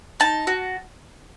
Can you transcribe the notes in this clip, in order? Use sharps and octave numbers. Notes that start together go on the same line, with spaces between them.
D#4 A5
F#4